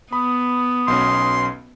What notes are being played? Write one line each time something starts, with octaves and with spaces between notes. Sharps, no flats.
B3 B5 D#6
B1 B2 C#4 C6